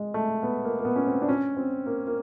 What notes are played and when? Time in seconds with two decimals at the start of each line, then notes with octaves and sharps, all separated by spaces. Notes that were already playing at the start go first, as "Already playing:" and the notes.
Already playing: G#3
0.14 A3
0.43 B3
0.65 A#3
0.79 A#3
0.85 B3
0.96 C#4
1.07 C4
1.22 D4
1.29 C#4
1.57 C4
1.86 A#3
2.07 A#3